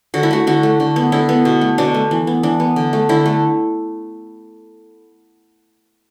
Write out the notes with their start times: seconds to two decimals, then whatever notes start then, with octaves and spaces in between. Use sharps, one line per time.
0.14 D3 F#4
0.23 E4
0.31 A3 F#4
0.47 D3 F#4
0.63 A3
0.80 D3
0.96 B3
1.12 D3 E4
1.29 B3
1.45 B2
1.61 A3
1.78 B2 D4
1.94 A3
2.11 E3
2.27 B3
2.43 E3 D4
2.60 B3
2.76 D3
2.93 A3
3.09 D3 E4
3.26 A3